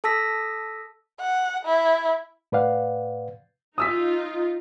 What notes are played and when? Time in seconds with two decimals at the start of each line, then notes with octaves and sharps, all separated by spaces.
0.04 A4 A5 E6 A#6 B6
1.20 F#5
1.65 E4
2.52 A2 B4 D5 F5 F#5
3.78 D#4 F4 D#6 E6 B6